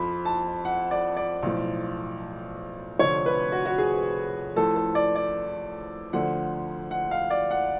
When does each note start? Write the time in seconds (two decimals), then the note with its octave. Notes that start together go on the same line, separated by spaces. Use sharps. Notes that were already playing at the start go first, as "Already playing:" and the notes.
Already playing: F2 F3 B5
0.25 A5
0.65 F#5
0.91 D5
1.17 D5
1.43 B1 A2 F3
2.99 F1 F2 D3 F3 C#5
3.26 B4
3.52 F#4
3.66 F#4
3.78 G#4
4.56 A1 A2 F3 A4
4.76 A4
4.95 D5
5.15 D5
6.13 D2 D3 F3 F#5
6.91 F#5
7.11 F5
7.30 D5
7.51 F#5